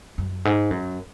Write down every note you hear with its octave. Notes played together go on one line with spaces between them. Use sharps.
F#2
G#2
F#2